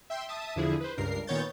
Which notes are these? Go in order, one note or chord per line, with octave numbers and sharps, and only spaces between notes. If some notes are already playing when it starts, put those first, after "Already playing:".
E5 G5 C6
E5 A5 D#6
E2 D3 F3 E4 G#4
B4 C5
C#2 G2 A#4 C7
A#2 D#3 B3 C#5 G6 A6